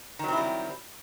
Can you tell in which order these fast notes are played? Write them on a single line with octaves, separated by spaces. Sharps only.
D#3 F#3 C4 E4 G3